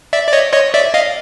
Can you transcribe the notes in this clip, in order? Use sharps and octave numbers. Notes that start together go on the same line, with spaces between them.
D5 E5
D5
C#5 D#5
C#5 D#5
D5 E5
D#5 F5